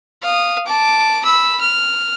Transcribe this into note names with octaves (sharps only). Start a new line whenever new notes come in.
F5 D#6
A5 D6
B5 E6
F6